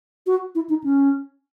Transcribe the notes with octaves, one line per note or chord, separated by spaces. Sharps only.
F#4
E4
D#4
C#4